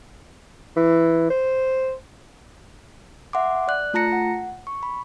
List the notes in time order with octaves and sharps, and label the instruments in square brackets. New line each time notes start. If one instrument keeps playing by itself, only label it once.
[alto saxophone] E3
C5
[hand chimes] E5 F#5 C6 D6
D5 F#6
A3 F4 A5 A#5 A#6 C#7
F#5
C#6
B5